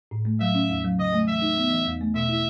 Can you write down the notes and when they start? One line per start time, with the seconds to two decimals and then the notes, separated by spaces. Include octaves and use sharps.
0.11 A2
0.25 A3
0.40 F#3 E5
0.55 C#4
0.70 E2
0.84 F#3
0.99 C#3 D#5
1.13 A3
1.28 E3 E5
1.42 D#4
1.56 B3
1.71 E3
1.86 E2
2.01 A3
2.15 B2 E5
2.29 E4